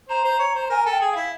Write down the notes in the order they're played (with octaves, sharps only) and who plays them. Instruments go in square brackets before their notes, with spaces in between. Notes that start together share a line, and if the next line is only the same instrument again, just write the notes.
[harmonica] C5 [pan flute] A#5
[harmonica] C5
C#5
C5
[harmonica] A#4 [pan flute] G#5
[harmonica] A4 [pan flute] G5
[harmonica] G#4
[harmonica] E4 [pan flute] F5